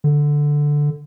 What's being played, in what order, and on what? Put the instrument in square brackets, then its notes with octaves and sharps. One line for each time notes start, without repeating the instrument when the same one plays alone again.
[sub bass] D3